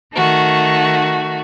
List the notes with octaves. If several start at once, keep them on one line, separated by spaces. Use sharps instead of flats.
D#3 A3 F#4